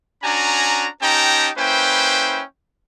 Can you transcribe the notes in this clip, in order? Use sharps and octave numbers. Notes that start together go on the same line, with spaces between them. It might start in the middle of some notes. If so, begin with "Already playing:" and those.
C#4 D4 F#4 G#5 A#5
C#4 D#4 G4 G5 A5 A#5
A#3 C#4 E4 B4 C5 G5